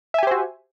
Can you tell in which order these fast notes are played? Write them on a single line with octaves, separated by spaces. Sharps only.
E5 G#5 G4 C5 F#4